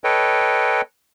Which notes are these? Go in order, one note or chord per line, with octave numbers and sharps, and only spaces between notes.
A4 B4 C#5 D#5 G5